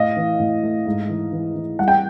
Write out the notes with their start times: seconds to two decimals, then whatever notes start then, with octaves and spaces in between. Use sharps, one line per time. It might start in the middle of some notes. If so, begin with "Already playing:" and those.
Already playing: A2 D#5 F5
0.16 E3
0.39 A2
0.63 A3
0.86 G#2
1.09 E3
1.33 E3
1.56 E3
1.79 G3 F#5
1.88 G5